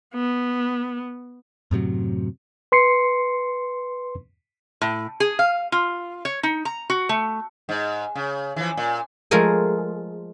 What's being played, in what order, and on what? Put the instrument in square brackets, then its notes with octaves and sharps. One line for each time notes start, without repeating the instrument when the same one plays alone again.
[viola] B3
[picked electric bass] F#2 A2 C3 F#3
[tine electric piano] B4 C6 C7 C#7
[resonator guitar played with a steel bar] A2
G#4
F5
F4
C#5
D#4
A#5
F#4
A3
[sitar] G#2
C#3
E3 F3
A#2
[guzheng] F3 G#3 A3 G#4 A#4 G#5